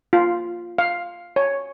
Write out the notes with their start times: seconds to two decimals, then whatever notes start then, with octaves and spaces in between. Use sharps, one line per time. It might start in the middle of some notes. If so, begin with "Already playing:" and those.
0.13 F4
0.78 F5
1.36 C#5